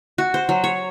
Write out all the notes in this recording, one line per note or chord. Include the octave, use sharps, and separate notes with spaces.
F#4
C5
F#3
C#5